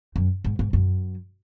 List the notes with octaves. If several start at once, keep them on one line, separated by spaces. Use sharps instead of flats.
F#2
G#2
G#2
F#2